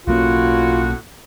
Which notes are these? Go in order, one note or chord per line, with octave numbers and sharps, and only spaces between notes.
B1 A2 A#3 C#4 F4 F#4